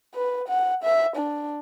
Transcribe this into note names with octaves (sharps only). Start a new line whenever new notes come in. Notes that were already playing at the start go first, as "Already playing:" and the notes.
B4
F#5
E5
D4